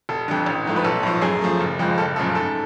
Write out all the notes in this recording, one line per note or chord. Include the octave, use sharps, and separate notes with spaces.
F1 A4
F2 D3
A1
G#2 F3 A3
B4
B1 A4
A2 F3
F#2 G#4
F3 A3
F#1
F2 F3 G#3
F#1 A4
F#2 C#3 F3 A3 A4
G#2 A4